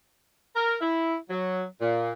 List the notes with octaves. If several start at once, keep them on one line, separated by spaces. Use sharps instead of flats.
A#4
E4
F#3
A#2